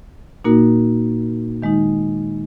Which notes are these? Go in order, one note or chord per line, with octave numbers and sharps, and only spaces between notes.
A#2 A#3 D#4 F#4 A#4
D#3 G#3 D#4